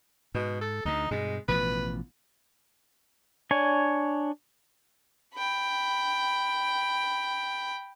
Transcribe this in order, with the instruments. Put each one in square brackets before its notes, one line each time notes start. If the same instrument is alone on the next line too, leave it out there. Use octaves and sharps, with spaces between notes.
[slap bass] G#2 [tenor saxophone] B2
[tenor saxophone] A4
[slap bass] D2 D3 [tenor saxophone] D#4
[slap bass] G2 B2 [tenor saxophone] G#3
[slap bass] A1 B2 F3 [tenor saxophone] B4
[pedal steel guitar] D4 C#5 G#5
[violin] G5 B5